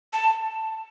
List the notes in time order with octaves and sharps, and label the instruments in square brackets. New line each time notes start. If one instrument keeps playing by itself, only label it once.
[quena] A5